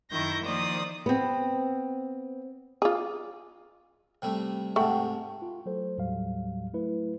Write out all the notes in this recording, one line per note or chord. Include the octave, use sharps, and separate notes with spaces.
F#2 D#3 E4 C#6 G6 A#6
D#3 F3 A#3 C5 D5 D#6
B3 C4
F4 G#4 D6
C3 G3 A3
G#2 C3 A3 F#5 G5 A5
F4
F#3 A3 A4 C5
D#2 A2 F#3 G3 F5
F#3 A3 E4 B4